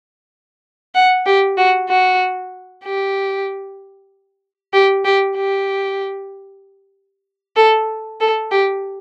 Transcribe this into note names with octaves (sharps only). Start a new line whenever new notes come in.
F#5
G4
F#4
F#4
G4
G4
G4
G4
A4
A4
G4